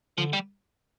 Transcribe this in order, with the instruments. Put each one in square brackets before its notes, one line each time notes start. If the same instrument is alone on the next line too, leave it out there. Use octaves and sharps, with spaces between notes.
[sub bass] D3 [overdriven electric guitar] F3
[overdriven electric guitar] G3